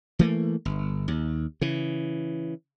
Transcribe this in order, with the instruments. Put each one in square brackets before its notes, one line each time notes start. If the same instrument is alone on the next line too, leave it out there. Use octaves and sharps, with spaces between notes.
[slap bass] E3 A3 A#3
G1
D#2
C#3 E3